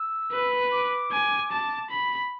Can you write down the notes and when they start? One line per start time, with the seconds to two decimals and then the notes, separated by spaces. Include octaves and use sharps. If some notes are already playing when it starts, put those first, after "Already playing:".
Already playing: E6
0.32 B4
0.72 D6
1.12 G#5
1.51 A5
1.90 B5